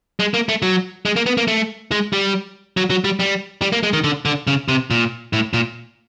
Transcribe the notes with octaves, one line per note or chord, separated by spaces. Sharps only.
G#3
A#3
A3
F#3
G#3
A#3
B3
A#3
A3
G#3
G3
F#3
F#3
G3
G3
G3
A#3
G#3
D#3
D3
D3
C#3
C3
A#2
A2
A#2